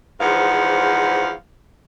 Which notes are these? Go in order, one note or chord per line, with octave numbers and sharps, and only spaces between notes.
E2 G#2 F3 F5 F#5